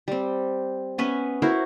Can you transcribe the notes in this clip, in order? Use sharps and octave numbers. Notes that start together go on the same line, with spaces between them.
G3 C4
B3 C#4 B4 E5
E4 F#4 A#4 C5